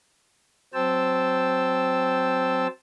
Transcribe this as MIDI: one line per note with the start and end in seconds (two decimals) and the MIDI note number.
0.74 2.67 54
0.74 2.67 60
0.74 2.67 72
0.74 2.67 79
0.74 2.67 81
0.74 2.67 88